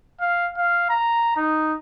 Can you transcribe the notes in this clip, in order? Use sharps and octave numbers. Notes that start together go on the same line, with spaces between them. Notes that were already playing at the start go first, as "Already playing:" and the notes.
F5
F5
A#5
D#4